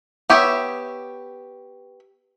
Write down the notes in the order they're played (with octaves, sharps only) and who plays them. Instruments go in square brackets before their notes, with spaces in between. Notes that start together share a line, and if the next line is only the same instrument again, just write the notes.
[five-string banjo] B3 G4 C#5 E5